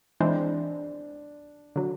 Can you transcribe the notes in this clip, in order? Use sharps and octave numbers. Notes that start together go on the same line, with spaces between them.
E3 G#3 C4 D4
D3 F#3